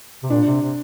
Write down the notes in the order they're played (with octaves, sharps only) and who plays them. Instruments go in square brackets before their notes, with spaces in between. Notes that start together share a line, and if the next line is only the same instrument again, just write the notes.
[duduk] C3
[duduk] A#2 [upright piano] D4
[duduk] C3
C3